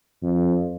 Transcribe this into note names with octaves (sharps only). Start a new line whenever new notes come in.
F2